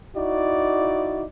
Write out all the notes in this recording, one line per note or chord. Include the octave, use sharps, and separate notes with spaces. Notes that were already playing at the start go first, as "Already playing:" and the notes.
D#4 E4 F#4 D5